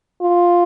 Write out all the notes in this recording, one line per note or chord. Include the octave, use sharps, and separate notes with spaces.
F4